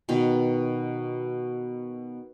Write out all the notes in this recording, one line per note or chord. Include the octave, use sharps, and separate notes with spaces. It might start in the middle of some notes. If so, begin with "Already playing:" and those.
B2 D#3